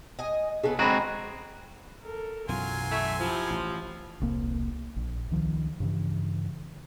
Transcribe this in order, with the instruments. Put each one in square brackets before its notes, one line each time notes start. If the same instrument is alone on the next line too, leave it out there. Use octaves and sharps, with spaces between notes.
[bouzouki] D#5 G#5
[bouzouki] C#3 A3 B3 [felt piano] G#4
[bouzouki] D3 D#5 F#5 [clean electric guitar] G#3 C4 F#4 [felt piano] A#5 B5
[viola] A4 A#4
[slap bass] B1 F#2 E3 [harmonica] F#3 G#5 C6 [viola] F4
[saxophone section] A3 E5 [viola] C#6
[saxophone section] F3 [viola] E4 G4
[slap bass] A1
[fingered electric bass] E1 C2 A#3
A#1
C#2 D#3 F3
G2 C#3 E3